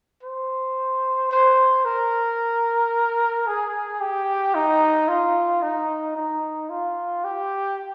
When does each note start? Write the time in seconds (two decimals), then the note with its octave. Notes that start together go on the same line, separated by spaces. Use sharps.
0.23 C5
1.31 C5
1.85 A#4
3.47 G#4
4.01 G4
4.55 D#4
5.08 F4
5.62 D#4
6.16 D#4
6.70 F4
7.24 G4